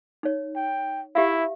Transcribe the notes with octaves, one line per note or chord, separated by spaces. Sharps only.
D#4 C#5
G5
E4 G4 E5 F5